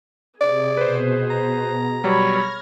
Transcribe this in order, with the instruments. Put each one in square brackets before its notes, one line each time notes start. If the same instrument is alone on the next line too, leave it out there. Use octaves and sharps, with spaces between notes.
[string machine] C3 [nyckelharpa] G#4 [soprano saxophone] D5
[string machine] B2 [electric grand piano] B4 C5
[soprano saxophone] A#5
[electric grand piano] F#3 G3 [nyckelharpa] C#5 B5 [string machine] F6 G#6 A#6